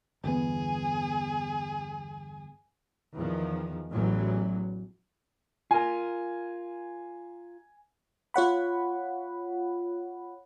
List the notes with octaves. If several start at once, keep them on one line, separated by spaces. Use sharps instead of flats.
G1 E2 B3 G#4
E2 D#3 F3
A1 E2 A2 E3 F#3
F4 A#4 G#5
F4 C#5 F#5 B5